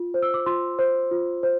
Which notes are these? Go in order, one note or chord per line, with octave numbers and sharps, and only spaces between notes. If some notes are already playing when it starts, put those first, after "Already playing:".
Already playing: F4
C5
E6
D6
F4 C6
C5
F4
C5